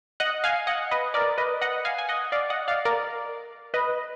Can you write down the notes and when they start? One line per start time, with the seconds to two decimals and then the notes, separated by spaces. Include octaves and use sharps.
0.20 D#5 F#5
0.44 F5 G#5
0.67 D#5 F#5
0.91 B4 D#5
1.14 A#4 D5
1.38 B4 D#5
1.62 D#5 F#5
1.85 F5 G#5
1.98 G#5
2.09 D#5 F#5
2.32 D5 F5
2.50 D#5 F#5
2.68 D5 F5
2.85 A#4 D5
3.74 B4 D#5